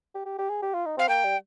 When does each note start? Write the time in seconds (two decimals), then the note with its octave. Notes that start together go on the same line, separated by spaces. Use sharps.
0.15 G4
0.26 G4
0.39 G4
0.49 G#4
0.62 G4
0.74 F4
0.86 D#4
0.97 C4 F5
1.08 A#3 G5
1.25 G3